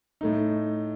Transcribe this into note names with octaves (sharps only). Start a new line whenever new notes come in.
A2 A3 D#4